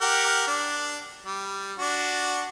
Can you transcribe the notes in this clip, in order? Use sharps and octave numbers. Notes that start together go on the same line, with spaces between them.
G4 A#4 F#5
D4
G3
D4 F#4